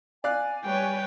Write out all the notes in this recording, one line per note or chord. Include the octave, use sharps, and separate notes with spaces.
D5 F5 G#5 F#6
G3 B4 C#5 G5